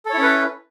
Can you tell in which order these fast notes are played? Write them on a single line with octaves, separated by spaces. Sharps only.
A4 C#5 E4 C#4 B4